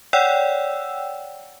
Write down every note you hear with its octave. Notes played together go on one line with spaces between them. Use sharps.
C#5 D5 F#5 G5 E6